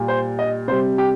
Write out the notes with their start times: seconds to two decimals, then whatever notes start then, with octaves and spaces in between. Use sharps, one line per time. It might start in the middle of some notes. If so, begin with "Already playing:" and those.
Already playing: A#2 G3
0.08 C5
0.39 D#5
0.68 C3 G3 C5
0.98 G4